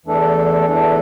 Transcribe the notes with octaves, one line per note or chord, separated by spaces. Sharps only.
E2 E3 A3 D4 A4
E2 E3 A3 D4 A4